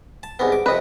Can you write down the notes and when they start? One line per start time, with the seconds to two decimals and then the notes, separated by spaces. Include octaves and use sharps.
0.23 A5
0.39 C2 G#2 B3
0.52 D6
0.66 F2 C3 B4 D#5